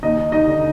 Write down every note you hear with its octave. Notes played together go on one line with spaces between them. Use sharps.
D#2 D#4 D#5
D#4 D#5
D3